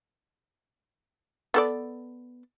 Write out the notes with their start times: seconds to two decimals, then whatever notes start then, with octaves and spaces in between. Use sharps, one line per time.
1.54 B3 A4 D5